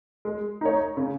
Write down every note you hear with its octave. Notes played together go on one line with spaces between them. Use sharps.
G#3
D#4 A#4 C#5
C#3